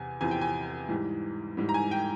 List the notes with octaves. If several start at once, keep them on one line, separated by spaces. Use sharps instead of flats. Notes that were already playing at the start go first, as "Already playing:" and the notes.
Already playing: E2 C3 C4 G#5
E2 C3 F3 C4 E4 G#5
G5
G#5
G#2 E3 G3
G#2 E3 G3
A#5
G#5
G5